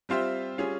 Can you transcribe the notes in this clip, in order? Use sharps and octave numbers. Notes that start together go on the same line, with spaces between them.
G3 C4 F4 C5 E5
G3 C#4 F4 G#4